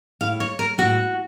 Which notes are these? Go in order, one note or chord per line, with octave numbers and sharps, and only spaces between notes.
A2 F5
C#5
A#4
A2 F#4